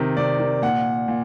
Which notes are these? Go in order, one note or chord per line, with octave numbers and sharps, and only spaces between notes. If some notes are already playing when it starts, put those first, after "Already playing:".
Already playing: C3 D#3
C3 D5
D#3
A#2 F#5
A#2